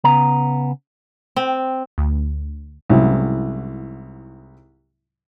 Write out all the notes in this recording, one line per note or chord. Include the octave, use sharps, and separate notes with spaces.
C#3 B3 A#5
C4
D2
C2 G#2 C#3 F#3 E4